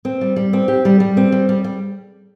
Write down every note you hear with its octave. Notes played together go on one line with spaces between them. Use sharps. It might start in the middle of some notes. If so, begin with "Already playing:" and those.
C4
G3
G3
C4
G4
G3
G3
C4
G3
G3
G3